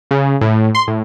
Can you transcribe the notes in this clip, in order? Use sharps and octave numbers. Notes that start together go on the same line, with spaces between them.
C#3
A2
C6
A2